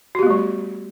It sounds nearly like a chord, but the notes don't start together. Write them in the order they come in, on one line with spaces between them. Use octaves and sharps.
F#4 G4 B3 A3 G3